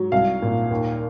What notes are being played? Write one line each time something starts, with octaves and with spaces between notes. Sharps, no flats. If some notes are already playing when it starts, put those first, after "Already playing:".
Already playing: G#2 F#3
C2 F5
A#2
D#2